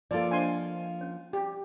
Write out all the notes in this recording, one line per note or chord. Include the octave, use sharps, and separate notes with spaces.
F3 A#3 F4 A4 D5
D4 C5 D#5 G#5 C6
C#4 C#5
G4